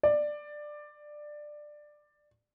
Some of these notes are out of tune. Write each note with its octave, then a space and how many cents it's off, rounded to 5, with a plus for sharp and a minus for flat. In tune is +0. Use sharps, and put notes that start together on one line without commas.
D5 +15